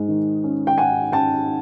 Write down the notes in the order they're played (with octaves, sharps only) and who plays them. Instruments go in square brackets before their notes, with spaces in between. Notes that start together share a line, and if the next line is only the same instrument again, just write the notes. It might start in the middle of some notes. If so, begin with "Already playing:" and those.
Already playing: [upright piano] G#2 G#3
D#3
C#4
G5
C#4 F#5 G#5
C#4 G5 A5